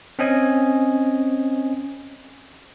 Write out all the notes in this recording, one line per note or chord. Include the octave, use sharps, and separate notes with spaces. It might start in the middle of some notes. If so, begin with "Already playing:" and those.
C4 C#4 D#5 G#5